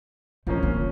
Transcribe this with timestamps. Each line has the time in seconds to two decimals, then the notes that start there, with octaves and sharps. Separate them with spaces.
0.47 D#3 F3 A#3 C#4
0.63 D3